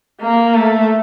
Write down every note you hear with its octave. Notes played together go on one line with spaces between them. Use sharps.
A#3
A3